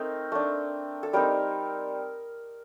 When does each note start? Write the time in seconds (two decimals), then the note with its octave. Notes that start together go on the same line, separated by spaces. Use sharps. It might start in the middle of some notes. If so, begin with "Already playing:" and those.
Already playing: A3 C4 D#4 A#4
0.32 A3 D4
1.03 A4
1.13 G3 C4 D#4 A#4